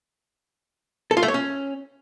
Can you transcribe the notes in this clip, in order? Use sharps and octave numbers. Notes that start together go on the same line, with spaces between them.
A4
F4
A3
C#5
C#4